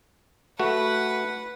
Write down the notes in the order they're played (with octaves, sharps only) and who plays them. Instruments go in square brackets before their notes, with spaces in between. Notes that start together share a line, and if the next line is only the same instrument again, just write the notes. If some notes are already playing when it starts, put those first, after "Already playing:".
[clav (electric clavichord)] A3 F#4 [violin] B4 F#5